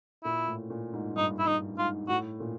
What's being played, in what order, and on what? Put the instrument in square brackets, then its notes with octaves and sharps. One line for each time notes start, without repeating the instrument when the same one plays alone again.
[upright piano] A#2 [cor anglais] E4
[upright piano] A2
A#2
G#2
[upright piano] G2 [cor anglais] D#4
[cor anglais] E4
[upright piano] G2 [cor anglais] D#4
[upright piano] G#2 [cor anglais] F4
[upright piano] A2 [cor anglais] F#4
[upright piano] A#2